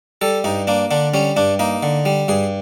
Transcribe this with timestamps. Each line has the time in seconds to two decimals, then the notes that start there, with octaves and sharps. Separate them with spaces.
0.21 G3 A4
0.44 G2 D#4
0.67 A#3 D4
0.91 D3 D4
1.14 G3 C#4
1.37 G2 D4
1.59 A#3 D#4
1.83 D3
2.05 G3
2.28 G2 G#4